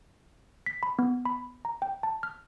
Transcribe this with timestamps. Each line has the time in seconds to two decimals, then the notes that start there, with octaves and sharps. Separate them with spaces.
0.66 B6
0.83 B5
0.99 B3
1.25 B5
1.65 A#5
1.82 G5
2.03 A5
2.23 F6